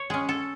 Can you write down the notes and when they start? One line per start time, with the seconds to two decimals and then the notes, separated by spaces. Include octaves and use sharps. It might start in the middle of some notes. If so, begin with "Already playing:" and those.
Already playing: C#5
0.10 G#3 C#4 G#4
0.29 A4